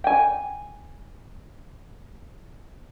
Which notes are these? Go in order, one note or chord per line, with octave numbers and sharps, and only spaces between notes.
G5 G#5